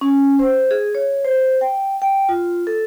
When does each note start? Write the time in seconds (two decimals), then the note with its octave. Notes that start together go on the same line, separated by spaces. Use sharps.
0.01 C#4
0.39 C5
0.71 G#4
0.95 C#5
1.25 C5
1.61 G5
2.02 G5
2.29 F4
2.67 A4